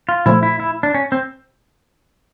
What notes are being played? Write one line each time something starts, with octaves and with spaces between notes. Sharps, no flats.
F4
A#2 F3 A3 E4
E4
E4
D4
C#4
C4